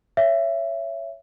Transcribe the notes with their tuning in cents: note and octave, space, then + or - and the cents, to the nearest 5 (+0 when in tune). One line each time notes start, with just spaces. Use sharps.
C#5 +0 E5 +20